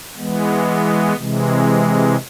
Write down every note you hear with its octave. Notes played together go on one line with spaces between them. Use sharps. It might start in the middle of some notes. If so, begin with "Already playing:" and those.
E3 G#3 B3
C3 E3 G#3